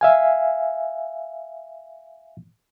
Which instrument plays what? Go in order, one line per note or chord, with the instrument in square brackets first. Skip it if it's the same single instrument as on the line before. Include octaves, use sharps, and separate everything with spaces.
[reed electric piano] E5 F5 G#5